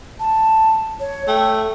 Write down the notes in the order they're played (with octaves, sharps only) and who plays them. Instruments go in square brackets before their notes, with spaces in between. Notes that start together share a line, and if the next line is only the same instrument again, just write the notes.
[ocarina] A5
C#5
[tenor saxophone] A3 [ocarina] G5